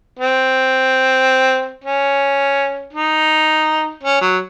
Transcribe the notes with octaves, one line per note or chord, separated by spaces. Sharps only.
C4
C#4
D#4
C#4
F#3